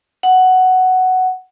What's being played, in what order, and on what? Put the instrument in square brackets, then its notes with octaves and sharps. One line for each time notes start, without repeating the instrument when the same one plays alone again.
[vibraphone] F#5